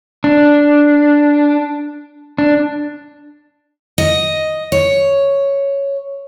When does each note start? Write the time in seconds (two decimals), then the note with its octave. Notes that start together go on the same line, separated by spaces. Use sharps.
0.24 D4
2.38 D4
3.98 D#5
4.72 C#5